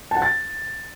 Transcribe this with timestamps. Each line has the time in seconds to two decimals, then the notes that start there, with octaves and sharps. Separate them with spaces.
0.11 A5
0.17 F#5
0.22 A6